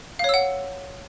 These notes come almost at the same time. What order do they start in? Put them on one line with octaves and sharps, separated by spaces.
F5 C#5 E6 F#5